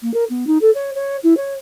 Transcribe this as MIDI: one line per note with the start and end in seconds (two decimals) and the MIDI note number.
0.02 0.12 58
0.14 0.24 70
0.29 0.44 59
0.47 0.57 63
0.61 0.70 69
0.74 0.90 73
0.95 1.17 73
1.23 1.36 64
1.37 1.54 73